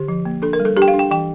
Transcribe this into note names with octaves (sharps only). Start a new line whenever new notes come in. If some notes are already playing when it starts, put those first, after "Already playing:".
Already playing: D3 G4
F3
A#3
D4 A4
A#4
G3
A4
D4 G4
G5
F5
D4
G5
E3 G5